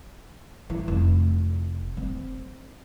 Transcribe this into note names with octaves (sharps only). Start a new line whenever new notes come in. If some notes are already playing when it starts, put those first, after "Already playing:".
E3
F1
C4